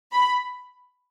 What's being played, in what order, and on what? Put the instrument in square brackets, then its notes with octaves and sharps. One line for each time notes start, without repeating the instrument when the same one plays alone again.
[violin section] B5